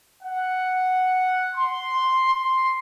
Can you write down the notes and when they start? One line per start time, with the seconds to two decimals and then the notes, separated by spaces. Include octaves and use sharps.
0.23 F#5
1.55 C6
2.29 C6